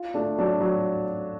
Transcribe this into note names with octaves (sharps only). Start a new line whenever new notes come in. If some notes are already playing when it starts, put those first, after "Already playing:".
Already playing: F4
A3 D4
F#3 D4
F#3